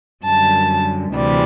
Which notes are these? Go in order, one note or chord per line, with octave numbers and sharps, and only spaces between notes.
F#2 D3 G3 A5
D2 C3 E3 G3